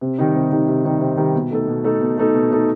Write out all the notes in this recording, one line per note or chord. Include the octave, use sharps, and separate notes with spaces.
C3
D#3 G3 D#4
C3
D#3 G3 D#4
C3
D#3 G3 D#4
C3
D#3 G3 D#4
B2
A3 D#4 A4
B2
A3 D#4 A4
B2
A3 D#4 A4
B2
A3 D#4 A4